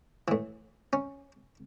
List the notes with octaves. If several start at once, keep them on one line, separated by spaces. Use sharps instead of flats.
A2 E3
C#4